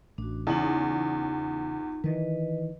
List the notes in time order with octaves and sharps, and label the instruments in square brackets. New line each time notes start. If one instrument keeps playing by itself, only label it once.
[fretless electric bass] A1 [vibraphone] D4 F#4
[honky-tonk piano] E2 [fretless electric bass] C#3 [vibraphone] D#4 F4
[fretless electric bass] D#3 E3 [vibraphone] B4 D#5